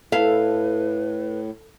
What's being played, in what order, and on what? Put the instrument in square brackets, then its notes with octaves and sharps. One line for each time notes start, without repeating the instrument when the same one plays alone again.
[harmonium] A2 [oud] E4 A4 [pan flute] B4 [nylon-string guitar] F5